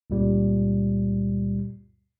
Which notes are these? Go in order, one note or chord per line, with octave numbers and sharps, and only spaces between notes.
C#2 F#2 A#2 G3